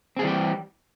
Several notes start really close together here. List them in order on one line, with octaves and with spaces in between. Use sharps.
C4 G#4 G3 E3 G4